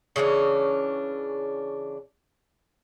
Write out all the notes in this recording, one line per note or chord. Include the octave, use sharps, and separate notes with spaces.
C#3 E3 C#4 D4